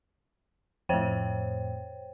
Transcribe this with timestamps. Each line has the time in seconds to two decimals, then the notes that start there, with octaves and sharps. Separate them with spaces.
0.89 F2 A2 C5 C#5 G5